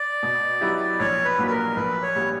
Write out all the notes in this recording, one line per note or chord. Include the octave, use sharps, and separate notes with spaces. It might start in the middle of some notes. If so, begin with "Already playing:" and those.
Already playing: D5
B2
F#3 B3 E4 G4
A#1 C#5
B4
A#2 F#3 A#3
B4
A#4
A#1 B4
C#5
A#2 G3 B3